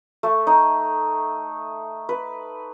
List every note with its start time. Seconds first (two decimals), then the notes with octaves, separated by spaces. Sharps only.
0.23 A3
0.47 D#4
2.09 B4